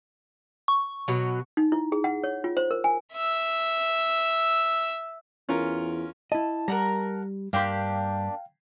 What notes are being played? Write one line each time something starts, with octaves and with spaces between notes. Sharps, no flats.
C#6
B2 F#3
D#4
E4
G#4
F#5
C#5
F4
C5
A#4
G#5
E5 E6
E2 C#4 F4 A#4
E4 D#5 A5
G3 A#4 F#5 A#5
G2 A#3 D4 G4 F5 G5 C6